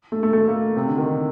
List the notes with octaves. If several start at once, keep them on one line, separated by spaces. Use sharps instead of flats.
A3
A3
A3
A#3
C3
D3
D#3